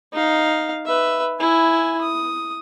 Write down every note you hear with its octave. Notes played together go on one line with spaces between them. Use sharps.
D#4 F5
B4 E5
E4 G#5
D#6